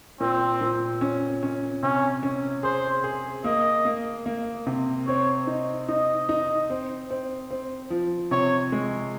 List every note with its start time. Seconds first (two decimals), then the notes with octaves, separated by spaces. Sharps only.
0.20 A#2 C4
0.61 A#2
1.01 C#4
1.43 C#4
1.83 C3 C#4
2.23 C#4
2.63 G#4 C5
3.04 G#4
3.44 A#3 D#5
3.85 A#3
4.26 A#3
4.66 C3
5.07 C4 C#5
5.47 D#4
5.88 D#4 D#5
6.29 D#4
6.70 C4
7.10 C4
7.51 C4
7.90 F3
8.31 C3 C#5
8.72 G#3